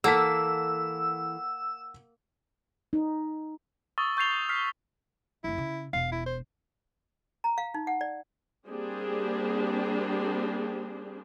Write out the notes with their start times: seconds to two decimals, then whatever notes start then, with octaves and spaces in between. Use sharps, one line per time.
0.04 E3 A#3 A4 F#5 E6 B6
2.93 D#4
3.98 C#6 D#6 E6 A6 G7
4.17 C#6 G6 A6 C7 F7 G7
4.49 F6 B6 C7
5.44 F#1 F#2 E4
5.58 C#3
5.93 E1 F5
6.12 E4
6.26 C5
7.44 A#5
7.58 F5
7.74 D#4
7.87 F#5
8.01 D5
8.67 G3 A#3 C4 D4 G4 G#4